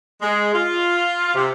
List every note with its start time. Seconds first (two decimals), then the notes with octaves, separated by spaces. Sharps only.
0.22 G#3
0.54 F4
1.35 C3